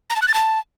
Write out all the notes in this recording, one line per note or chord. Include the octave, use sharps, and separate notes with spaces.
A#5
A5
F#6
A6
A5